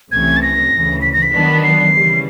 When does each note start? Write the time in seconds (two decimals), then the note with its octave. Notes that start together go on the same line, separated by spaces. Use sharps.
0.11 C2 C3 E3 A3 C#4 G#6
0.37 A6
0.42 A#6
0.72 D2 C#3 E3
1.02 B6
1.13 A#6
1.23 B6
1.32 D#3 F#3 B3 D4
1.63 C7
1.93 C#3 E3 G3